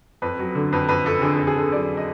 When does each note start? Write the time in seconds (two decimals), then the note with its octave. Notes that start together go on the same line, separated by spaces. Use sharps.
0.22 F2 B4
0.39 F#3
0.55 D3
0.72 F2 B4
0.89 F2 B4
1.06 F2 A4
1.22 D3 G#4
1.34 F2 A4
1.47 G#4
1.56 D3 A4
1.72 F#3 D5
1.97 D#5